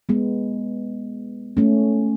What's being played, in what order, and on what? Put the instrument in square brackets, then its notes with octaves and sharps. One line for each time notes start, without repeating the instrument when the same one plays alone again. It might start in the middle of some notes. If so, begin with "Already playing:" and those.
[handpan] G#3 B3
A3 C#4